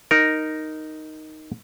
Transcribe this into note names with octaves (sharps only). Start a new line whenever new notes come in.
D#4 A#4